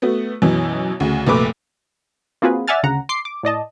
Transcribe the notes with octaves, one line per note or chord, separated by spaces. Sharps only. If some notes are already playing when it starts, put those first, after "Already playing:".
A3 B3 F#4
F#2 B2 E3
D2 C#3
F1 A#2 A3 B4 D6
A#3 C4 F4 F#4 G#4 B4
D5 E5 F#5 G#5 F6 A6
D2 C#3 F#5 A#5
C6 D6 C7
D6
A2 D5 D#5 A5